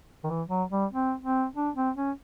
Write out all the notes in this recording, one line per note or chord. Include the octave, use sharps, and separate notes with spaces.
D#3
E3
F#3
G3
C4
C4
D4
C4
C#4